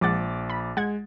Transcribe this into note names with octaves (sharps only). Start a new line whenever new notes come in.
A#1 F3 G#3 F#5 D6 A6
B5
G#3 F#5 G#6